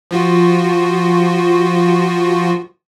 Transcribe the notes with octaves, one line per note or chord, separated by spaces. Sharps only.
F3 F4 F#4